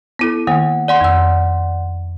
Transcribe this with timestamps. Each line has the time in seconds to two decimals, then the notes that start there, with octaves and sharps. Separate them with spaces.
0.19 B3 E4 A4
0.47 D#3 A#3 F#5
0.88 D5 F#5 C6
1.01 F2 E6